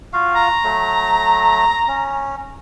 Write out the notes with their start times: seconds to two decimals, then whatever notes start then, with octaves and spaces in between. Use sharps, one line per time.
0.13 F4 F#4 F5
0.35 A#5
0.64 F#3 A3
1.88 C#4